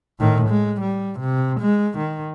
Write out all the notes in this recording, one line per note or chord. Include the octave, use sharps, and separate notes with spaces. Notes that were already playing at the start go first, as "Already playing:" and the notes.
A2 D#3
G#3
G3
C3
G#3
D#3